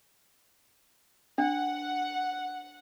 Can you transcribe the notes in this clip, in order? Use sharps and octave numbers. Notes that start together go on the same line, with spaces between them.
D4 F#5